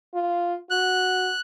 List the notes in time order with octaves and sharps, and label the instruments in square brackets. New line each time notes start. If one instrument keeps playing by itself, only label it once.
[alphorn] F4
[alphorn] F#4 [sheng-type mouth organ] F#6